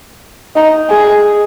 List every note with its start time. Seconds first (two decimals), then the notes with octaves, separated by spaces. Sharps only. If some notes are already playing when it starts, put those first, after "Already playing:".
0.56 D#4
0.90 G#4